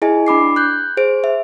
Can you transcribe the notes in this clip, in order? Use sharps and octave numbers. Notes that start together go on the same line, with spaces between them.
E4 G#4 D#5 G#5
D4 B5 D6 C7
F#6 G6
G#4 C5 D7
E5